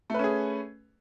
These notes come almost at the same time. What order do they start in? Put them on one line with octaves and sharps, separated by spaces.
A3 B4 C#4 G#4